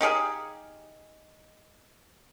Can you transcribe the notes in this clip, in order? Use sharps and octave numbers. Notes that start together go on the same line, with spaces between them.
D#4 G4 G#4 F5